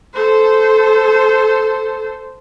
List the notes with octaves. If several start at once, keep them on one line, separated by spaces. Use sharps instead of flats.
A4 C5